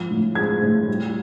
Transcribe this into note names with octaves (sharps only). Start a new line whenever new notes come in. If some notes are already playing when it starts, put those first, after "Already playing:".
Already playing: G#2 F3
A2
G#3 G#6
A2
G3